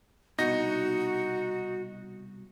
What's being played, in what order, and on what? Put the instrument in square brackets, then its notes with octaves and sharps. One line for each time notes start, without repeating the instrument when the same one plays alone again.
[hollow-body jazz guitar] C2 B2 [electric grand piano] D#4 A#6 [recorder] F#4